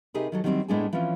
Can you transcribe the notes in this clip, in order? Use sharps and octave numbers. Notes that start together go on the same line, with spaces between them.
C3 D#4 G4 G#4 A#4 B4
D#3 F#3 A4
D#3 F#3 G3 A#3 C4 E4
A2 G#3 B3 D4 G#4 G#5
E3 F3 C4 C#4 F4